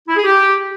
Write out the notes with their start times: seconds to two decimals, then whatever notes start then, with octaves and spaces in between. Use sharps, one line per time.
0.08 E4
0.16 G#4
0.24 G4